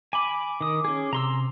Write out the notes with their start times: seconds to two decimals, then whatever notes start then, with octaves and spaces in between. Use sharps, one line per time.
0.13 G#5 B5 D6
0.61 D#3 D#6
0.85 C#4 G#4
1.13 C3 A#5 C6 E6